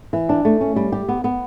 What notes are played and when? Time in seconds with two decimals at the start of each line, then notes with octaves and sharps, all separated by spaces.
0.13 E3
0.29 D4
0.45 A3
0.61 C#4
0.76 G3
0.92 G4
1.09 B3
1.24 B3